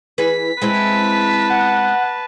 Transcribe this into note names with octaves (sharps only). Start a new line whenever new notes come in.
E3 G#4 B4 B6
G#3 C4 E4 B4 A5
F#5